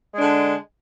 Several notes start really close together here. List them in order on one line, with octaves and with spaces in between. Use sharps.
G#3 D4 D3